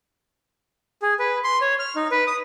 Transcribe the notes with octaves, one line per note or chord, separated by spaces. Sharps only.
G#4
B4
C6
C#5
F6
D#4
B4
D#6